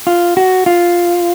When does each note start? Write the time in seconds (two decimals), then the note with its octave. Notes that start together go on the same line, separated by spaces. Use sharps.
0.07 F4
0.37 F#4
0.66 F4